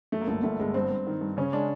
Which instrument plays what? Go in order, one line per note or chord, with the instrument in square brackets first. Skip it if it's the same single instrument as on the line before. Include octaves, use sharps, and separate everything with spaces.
[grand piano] F#2 [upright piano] A3
[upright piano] A#3
[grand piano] G1 [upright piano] A3
[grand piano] G1 [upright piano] A3
[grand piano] G1 [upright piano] G#3
[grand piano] G2 [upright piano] C4
[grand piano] G2
D#3
G2
[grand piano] C#3 [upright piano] C#4
[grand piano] G#3 [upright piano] D4